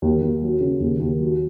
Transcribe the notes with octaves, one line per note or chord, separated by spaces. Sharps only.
D#2
D#2
F#3
C#3
D#2
D#2
F#3